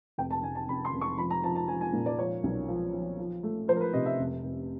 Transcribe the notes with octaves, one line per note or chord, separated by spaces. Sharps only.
F1 G5
A5
F1 G#5
A5
F1 B5
C6
F1
C#6
F3 B5
A#5
F3 A5
A5
F3 G#5
G#5
A#2
D5
F3 C#5
B1
F3
F3
F3
A3
F3 C5
A#4
B4
C3 D#5
E5
F1
F1